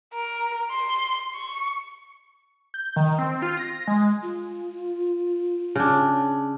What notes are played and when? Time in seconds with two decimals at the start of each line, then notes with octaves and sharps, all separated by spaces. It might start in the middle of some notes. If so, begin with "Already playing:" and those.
0.14 A#4
0.71 C6
1.34 C#6
2.74 G6
2.96 D#3
3.19 C4
3.42 F4
3.57 A#6
3.87 G#3
4.22 F4
5.76 C#3 D4